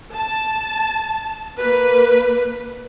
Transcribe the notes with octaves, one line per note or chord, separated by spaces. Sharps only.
A5
A#3 B4